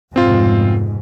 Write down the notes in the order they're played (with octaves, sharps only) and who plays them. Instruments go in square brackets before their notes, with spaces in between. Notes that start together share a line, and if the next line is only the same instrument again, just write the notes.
[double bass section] F1 G#2 B2 [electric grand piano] C4 F4